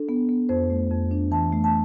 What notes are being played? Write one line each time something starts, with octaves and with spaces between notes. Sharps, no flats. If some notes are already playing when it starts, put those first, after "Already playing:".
Already playing: D4 A4
B3
B3
F2 C5
A3
F2
D4
E3 A5
A3
A5